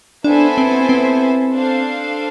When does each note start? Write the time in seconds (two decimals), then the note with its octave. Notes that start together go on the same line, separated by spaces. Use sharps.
0.24 B3 D4 E4 A4 C5 G#5
0.58 C4
0.89 C4
1.54 D4 A4 C5 F5